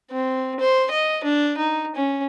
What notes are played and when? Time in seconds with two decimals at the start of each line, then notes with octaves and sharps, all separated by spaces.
0.11 C4
0.60 C5
0.91 D#5
1.24 D4
1.57 D#4
1.96 C#4